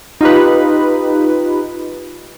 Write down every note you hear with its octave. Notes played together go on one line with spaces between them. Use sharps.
D#4 F4 G4 B4